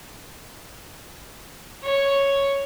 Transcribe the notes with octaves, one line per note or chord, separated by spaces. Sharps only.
C#5